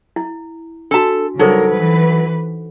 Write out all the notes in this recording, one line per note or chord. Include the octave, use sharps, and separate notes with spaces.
E4
D4 F#4 A4 A5
C#3 F#3 G3 D#4 A4 A#4 C5
E3 B4